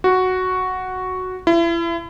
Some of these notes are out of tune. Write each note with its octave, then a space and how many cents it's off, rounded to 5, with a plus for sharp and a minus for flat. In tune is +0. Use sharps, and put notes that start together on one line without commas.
F#4 +0
E4 +35